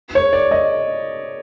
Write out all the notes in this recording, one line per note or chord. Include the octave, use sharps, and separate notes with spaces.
C#5
D5
D#5